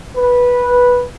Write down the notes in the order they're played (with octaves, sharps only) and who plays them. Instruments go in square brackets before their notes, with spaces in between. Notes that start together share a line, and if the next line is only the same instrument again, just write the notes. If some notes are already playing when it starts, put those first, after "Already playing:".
[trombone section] B4